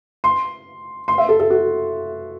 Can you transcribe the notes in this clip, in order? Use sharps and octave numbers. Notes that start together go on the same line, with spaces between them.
C6
C6
E5
A4
A4
F#4